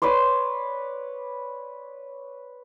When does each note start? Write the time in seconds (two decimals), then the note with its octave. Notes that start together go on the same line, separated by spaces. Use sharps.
0.02 B4 C#5 D5 C6